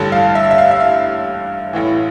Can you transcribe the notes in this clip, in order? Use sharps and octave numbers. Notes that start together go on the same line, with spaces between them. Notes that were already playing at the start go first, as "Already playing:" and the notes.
Already playing: A1 G2 D3 A5
F5
E5
E5
F5
E5
F5
A1 A2 E3